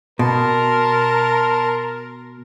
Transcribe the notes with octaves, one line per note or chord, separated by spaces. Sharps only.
B2 A#4 A5 C6